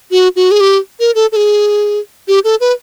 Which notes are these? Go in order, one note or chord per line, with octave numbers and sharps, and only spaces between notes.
F#4
F#4
G#4
G4
A#4
A4
A4
G#4
G4
A4
B4